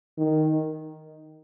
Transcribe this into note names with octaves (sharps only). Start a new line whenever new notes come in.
D#3